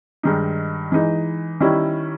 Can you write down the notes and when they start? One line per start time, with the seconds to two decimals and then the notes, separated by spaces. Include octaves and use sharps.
0.23 G2 D#3 G#3 D#4
0.92 E3 G#3 D#4
1.61 D#3 G3 C#4 E4